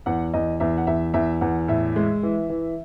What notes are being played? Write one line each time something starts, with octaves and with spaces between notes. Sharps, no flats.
E2 F#5
E2 D#5
E2 E5
F#5
E2 E5
E2 E5
E2 F#5
A2 E5
G#3
E3
E3